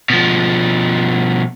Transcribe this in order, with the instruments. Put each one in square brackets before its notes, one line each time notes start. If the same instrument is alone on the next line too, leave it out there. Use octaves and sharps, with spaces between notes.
[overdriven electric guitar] B2 F3